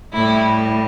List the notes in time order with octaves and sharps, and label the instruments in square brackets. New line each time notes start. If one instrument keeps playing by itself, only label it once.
[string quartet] A2 G3 E4